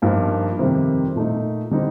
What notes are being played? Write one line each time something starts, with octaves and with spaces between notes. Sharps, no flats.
G2 F3 A#3 D#4
F2 C3 D#3 G3
A#2 A3 D#4
D3 G3 C4 D#4